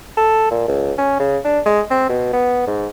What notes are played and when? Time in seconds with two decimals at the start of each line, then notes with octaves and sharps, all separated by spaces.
0.17 A4
0.51 A#2
0.68 C#2
0.98 C#4
1.20 C#3
1.45 D4
1.66 G#3
1.90 C4
2.09 B2
2.33 B3
2.67 G#2